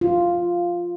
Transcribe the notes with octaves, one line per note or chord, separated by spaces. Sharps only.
F4